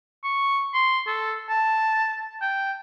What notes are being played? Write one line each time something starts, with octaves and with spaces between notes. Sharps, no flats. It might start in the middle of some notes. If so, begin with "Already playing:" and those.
C#6
C6
A4
A5
G5